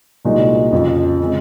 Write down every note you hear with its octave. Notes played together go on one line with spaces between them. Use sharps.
C2 A#2 G#3 D#4 F#4
F2 C#3 F3
C#3 G#3 C4